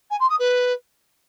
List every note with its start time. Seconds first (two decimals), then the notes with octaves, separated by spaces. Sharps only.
0.10 G#5
0.20 C6
0.29 D#6
0.39 B4